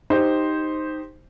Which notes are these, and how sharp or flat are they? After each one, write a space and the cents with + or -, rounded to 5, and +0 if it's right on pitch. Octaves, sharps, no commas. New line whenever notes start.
D#4 +0 G4 +0 C5 +0